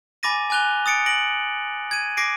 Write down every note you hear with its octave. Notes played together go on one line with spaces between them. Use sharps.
G#5 B5 D6 A6 A#6 D#7
G#5 D6 F#6 F7 G7
D#6 A6 C#7 D7
A#6 D7 F#7
G#6 D#7
D6 A#6 C7 D7